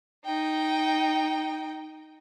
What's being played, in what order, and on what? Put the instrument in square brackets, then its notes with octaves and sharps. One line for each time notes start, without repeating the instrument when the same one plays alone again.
[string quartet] D#4 G5